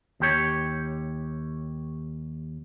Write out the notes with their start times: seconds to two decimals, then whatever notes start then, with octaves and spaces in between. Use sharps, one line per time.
0.20 D#2 G4 C#5